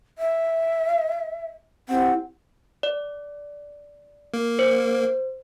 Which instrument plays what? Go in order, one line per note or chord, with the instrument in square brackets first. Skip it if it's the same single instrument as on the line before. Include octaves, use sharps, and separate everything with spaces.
[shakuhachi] E5
[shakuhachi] C4 [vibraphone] E4 G4 F#5
[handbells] D5
[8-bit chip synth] A#3
[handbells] C5